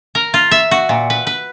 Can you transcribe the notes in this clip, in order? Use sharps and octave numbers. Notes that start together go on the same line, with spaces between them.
A#4
F4
E5
F#4
A#2
B4
B4